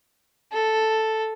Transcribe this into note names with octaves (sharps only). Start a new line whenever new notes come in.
A4